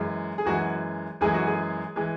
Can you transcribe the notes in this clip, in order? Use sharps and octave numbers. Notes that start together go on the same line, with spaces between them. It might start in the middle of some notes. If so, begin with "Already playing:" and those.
Already playing: F#2 E3 G#3
G#4
F#2 E3 G#3 F#4
F#2 E3 G#3 G#4
F#4
G#4
E3 G#3